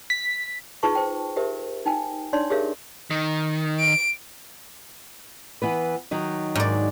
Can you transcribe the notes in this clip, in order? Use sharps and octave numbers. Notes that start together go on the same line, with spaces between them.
B6
D#4 F4 G#4 B4 A5 C#6
C5 G5
G4 A#4 C5 E5
D#4 G5 G#5
D4 D#4 C#5 D5 C6
G4 G#4 A#4 C#5 E5 F5
D#3
D7
E3 B3 B4
D#3 F#3 D#4
G#2 D5